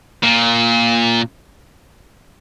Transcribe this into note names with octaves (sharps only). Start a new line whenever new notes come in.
A#2